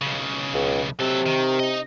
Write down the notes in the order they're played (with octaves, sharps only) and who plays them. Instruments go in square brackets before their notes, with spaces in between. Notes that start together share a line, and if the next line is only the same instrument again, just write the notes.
[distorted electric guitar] B1 C#3
[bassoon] C#2
[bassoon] C3 [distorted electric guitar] F#3 A4
[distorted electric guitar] D#3
D#4 D#5